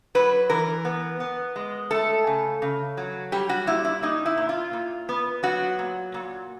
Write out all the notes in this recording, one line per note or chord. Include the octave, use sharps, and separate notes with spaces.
F#3 B4
E3 A#4
B3
B3
G#3
A3 A4
C#3
C#3
F#3
G3 G4
F#4
A#2 E4
E4
A#2 D#4
E4
A#2
F4
A#2
B3
F#3 F#4
A#2
A#2